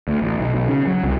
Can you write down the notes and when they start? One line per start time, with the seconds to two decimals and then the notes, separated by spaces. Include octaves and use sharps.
0.08 D2
0.22 A1
0.39 B1
0.55 B1
0.68 C#3
0.87 F#3
1.03 C2